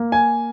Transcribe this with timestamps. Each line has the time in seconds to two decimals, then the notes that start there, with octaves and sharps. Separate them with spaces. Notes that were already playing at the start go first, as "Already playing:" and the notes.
Already playing: A#3
0.12 G#5